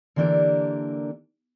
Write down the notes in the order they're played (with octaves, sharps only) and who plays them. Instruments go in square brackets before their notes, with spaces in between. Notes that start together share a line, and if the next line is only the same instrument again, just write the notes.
[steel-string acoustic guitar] D3 E3 A#3 D4 G4 A#4